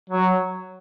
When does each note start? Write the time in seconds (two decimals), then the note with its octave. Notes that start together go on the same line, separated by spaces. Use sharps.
0.10 F#3